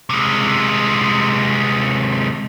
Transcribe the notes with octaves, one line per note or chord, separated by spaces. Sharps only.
C3 G#3